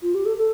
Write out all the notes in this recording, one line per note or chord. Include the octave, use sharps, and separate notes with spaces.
F4
G4
A4
A4